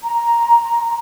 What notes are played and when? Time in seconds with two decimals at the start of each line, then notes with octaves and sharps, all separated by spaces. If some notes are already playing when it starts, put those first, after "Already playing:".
0.02 A#5 C6